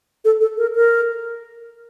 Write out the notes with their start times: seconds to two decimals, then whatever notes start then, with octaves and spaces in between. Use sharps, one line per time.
0.25 A4
0.41 A4
0.58 A#4
0.75 A#4